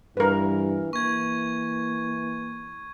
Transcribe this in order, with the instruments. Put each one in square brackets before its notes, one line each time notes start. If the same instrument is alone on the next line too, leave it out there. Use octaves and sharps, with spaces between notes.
[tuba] G2 [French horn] E3 [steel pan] A#4 B4
[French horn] E3 [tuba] A#3 [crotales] C#6 G#6